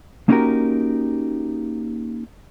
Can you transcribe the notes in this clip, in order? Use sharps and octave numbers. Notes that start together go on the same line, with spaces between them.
A#3 C#4 D#4 F#4 G4 A#4